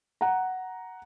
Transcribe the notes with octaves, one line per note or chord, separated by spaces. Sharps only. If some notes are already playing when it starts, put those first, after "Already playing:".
F#5 A#5